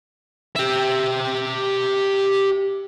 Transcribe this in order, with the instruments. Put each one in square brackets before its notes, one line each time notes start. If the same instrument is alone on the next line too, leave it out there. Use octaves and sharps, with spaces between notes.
[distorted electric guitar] G4 E5